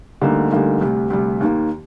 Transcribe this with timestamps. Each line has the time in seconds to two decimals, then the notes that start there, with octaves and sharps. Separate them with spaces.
0.22 D2 D3 G3 A#3 D#4
0.51 D2 D3 G3 A#3 D#4
0.81 D2 C3 G3
1.10 D2 C3 G3
1.40 D#2 D#3 A#3